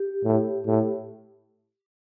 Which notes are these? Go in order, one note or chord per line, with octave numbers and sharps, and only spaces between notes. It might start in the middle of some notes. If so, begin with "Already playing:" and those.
Already playing: G4
A2
A2